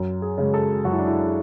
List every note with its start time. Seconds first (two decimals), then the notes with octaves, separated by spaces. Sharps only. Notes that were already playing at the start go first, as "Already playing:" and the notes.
Already playing: F#2
0.22 G#4
0.38 C#3 G#3
0.54 A4
0.85 F#2 F#4
0.92 E4
0.99 D4
1.06 E4